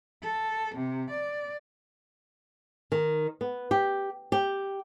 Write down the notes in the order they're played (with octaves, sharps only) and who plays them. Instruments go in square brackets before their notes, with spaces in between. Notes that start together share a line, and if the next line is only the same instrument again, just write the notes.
[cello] A4
C3
D5
[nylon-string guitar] D#3
B3
G4
G4